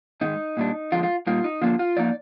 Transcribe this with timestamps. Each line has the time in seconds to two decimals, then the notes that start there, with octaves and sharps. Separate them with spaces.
0.21 G#2 D#3 G#3 D#4
0.57 A#2 G3 D4
0.92 F2 D3 F3 G#3 C4 F4
1.03 F4
1.27 A#2 G3 A#3 D#4 F4
1.44 D#4
1.62 D3 F3 A#3 D4 F4
1.79 F4
1.97 F3 A#3 D#4 D5